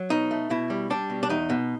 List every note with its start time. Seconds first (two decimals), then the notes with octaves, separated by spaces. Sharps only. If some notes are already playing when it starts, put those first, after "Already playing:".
Already playing: F#3
0.10 B2 D#4
0.31 A3
0.50 B2 E4
0.70 G3
0.90 G3 D4
1.10 B2
1.23 D4
1.29 E2 D#4
1.50 B2